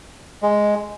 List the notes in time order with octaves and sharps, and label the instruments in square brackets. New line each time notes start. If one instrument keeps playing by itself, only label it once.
[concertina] G#3